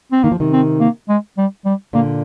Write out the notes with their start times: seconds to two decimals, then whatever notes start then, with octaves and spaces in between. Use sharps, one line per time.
0.12 C4
0.24 D#3 A#3
0.32 F3
0.40 C3 D#3
0.53 C4
0.80 A#3
1.09 G#3
1.38 G3
1.65 G3
1.93 A#2 D3 A#3